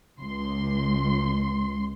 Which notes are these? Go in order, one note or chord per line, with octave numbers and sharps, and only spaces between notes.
C#2 C6